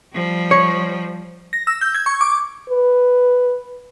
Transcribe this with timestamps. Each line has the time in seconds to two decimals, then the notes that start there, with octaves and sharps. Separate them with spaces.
0.14 F3 G3
0.51 C#5
1.53 A#6
1.67 E6
1.81 G6
1.95 G#6
2.06 C#6
2.21 D6
2.70 B4